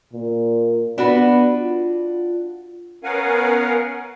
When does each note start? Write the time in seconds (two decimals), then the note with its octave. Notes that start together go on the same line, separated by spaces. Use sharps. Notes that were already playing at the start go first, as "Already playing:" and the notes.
0.13 A#2
0.98 B3 D4 F#4 B4
1.54 F4
3.04 B3 C#4 A#4 F5 F#5 G#5